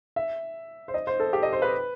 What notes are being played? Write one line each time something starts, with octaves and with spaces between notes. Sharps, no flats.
E5
C5
D#5
C5
A4
G4
D#5
C5
B4